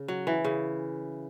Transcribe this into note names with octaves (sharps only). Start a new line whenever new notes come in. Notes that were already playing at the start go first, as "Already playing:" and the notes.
Already playing: C#3
F#3
E3
C#3